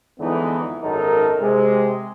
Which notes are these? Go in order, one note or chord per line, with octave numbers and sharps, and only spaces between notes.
F2 D3 E3 G#3 B3 D#4
G#1 F#2 D#4 A4 A#4
C3 G#3